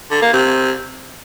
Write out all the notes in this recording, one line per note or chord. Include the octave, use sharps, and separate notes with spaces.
D3
A#3
C3